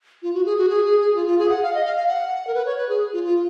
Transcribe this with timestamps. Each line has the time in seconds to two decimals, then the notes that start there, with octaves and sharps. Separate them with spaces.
0.23 F4
0.34 F#4
0.46 G#4
0.58 F#4
0.69 G#4
0.85 G#4
1.00 G#4
1.16 F4
1.27 F4
1.39 G#4
1.50 F#5
1.62 F5
1.74 D#5
1.85 F5
1.97 F5
2.08 F#5
2.47 A#4
2.54 B4
2.66 C#5
2.78 B4
2.89 G#4
3.13 F4
3.24 F4